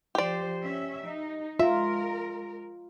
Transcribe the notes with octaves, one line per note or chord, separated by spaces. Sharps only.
F3 G4 C5 D5
C#4 E5
D#4
G#3 F4 A#4 E5